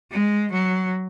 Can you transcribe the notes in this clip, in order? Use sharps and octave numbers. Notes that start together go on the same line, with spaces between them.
G#3
F#3